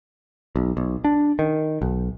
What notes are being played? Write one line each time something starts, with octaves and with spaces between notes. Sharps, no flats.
B1
B1
D4
D#3
B1